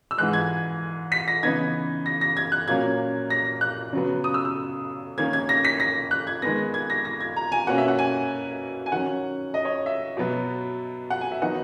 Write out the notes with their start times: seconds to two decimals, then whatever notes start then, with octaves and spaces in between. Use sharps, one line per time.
0.11 E6
0.18 G#2 E3 G#3 F#6
0.33 G#6
1.12 B6
1.28 A#6
1.43 C#3 E3 B3 D#4 G#6
2.06 A#6
2.21 A#6
2.37 G#6
2.52 F#6
2.68 A#2 F#3 A#3 C#4 G#6
3.30 A#6
3.61 F#6
3.93 C#3 F#3 B3
4.24 D#6
4.34 E6
4.45 E6
5.18 D#3 A#3 C#4 G#6
5.33 G#6
5.49 A#6
5.65 B6
5.80 A#6
6.11 F#6
6.27 G#6
6.42 D#3 G#3 B3 A#6
6.74 G#6
6.90 A#6
7.05 A#6
7.20 G#6
7.36 A#5
7.52 G#5
7.67 B2 A#3 C#4 F#5
7.78 E5
7.88 F#5
7.99 G#5
8.86 G#5
8.92 D#3 F#3 C#4 F#5
9.54 D#5
9.65 C#5
9.86 E5
10.17 B2 F#3 B3
11.10 F#5
11.21 G#5
11.32 E5
11.42 D#3 F#3 B3 D#4 F#5